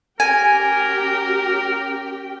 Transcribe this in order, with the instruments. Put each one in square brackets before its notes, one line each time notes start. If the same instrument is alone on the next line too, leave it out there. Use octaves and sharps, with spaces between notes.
[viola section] C#4 G4 G5 [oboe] A#4 [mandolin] G#5